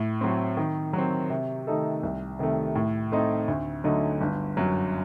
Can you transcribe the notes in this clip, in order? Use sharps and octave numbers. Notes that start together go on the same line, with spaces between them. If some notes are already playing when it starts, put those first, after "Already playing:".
Already playing: A2
F#3 C4
D#3
F#3 C4
C3
D#3 A3 D#4 A4
C2
C3 D#3 A3
A2
A3 C4 D#4
D2
D3 F#3 A3 D#4
G1
F#2 F#3